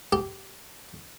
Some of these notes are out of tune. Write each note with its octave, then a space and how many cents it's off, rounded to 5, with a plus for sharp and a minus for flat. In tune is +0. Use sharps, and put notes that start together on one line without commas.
G4 -20